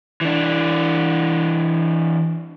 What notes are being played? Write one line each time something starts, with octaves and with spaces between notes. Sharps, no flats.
E3 D4